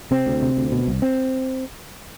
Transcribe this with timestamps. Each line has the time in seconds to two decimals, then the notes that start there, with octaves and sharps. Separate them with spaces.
0.11 C3 C4
0.27 D2
0.42 C3
0.57 D2
0.72 B2
0.87 C2
1.02 C4